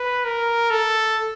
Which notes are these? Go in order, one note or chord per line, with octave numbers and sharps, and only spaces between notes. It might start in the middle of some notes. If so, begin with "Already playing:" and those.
Already playing: B4
A#4
A4